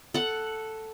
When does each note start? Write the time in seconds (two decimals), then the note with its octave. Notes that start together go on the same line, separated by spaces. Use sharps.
0.14 A4 F#5